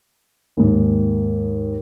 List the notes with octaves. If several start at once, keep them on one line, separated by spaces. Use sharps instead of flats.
D#2 G#2